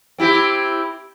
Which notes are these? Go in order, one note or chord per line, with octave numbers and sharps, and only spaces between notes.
C4 E4 G4